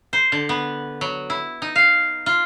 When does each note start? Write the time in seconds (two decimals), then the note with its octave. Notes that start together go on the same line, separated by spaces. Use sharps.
0.13 C5
0.32 D3
0.49 B3
1.01 F#3
1.30 E4
1.62 D#4
1.76 F5
2.26 F4